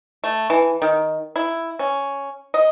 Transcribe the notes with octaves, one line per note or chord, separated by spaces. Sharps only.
A3
E3
D#3
E4
C#4
D#5